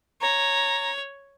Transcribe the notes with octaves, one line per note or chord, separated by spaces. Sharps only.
C#5 A#5